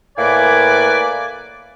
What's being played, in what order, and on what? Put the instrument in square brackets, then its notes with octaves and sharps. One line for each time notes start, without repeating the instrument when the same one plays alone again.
[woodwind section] A2 A#3 B4 D5 G#5 D6